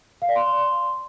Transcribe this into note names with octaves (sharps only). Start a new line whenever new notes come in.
F5
D5
C6